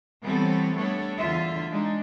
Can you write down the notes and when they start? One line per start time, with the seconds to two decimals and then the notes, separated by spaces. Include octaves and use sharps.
0.22 E3 G3 B3 C4 A4 C#5
0.75 G3 A3 B3 D4 A4 C#5
1.17 E2 A2 D3 F4 E5
1.70 G#3 D4 D#4